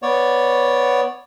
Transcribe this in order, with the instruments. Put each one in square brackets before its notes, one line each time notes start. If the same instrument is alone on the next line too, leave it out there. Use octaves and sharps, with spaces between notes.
[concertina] B3 C#5 D5